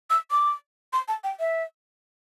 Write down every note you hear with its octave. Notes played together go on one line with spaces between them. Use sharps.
E6
D6
C6
A5
G5
E5